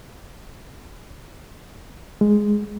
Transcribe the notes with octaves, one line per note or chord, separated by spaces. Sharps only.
G#3